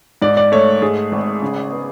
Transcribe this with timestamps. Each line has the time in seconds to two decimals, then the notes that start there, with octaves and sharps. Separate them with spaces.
0.22 G#2 D5
0.37 D5
0.52 A3 C#5
0.82 G#2 G#4
1.12 G#1
1.42 C#3
1.72 B3